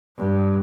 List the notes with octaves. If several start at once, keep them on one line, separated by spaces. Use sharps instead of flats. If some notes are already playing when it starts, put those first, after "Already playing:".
G2